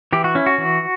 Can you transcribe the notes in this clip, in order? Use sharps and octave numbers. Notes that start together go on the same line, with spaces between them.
E3 G4
F#4
C#4 E4
F#4
E3